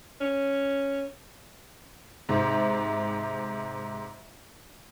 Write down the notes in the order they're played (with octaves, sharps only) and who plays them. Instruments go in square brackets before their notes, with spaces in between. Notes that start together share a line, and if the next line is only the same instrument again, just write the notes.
[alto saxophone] C#4
[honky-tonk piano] G#2 C3